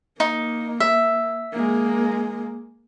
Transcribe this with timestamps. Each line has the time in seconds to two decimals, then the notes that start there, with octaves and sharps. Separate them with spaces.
0.20 A#3 D#4
0.80 E5
1.53 G#3 A#3